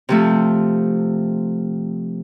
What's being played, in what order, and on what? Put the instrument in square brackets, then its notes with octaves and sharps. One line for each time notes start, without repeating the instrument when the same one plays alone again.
[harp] C3 F3 A3